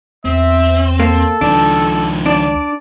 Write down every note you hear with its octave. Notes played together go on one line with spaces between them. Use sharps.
E2 C4 E5
A#3 A4
C#2 D#3 F3 D4
D4 D5